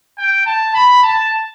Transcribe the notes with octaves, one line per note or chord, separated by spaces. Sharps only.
G5
A5
B5
A5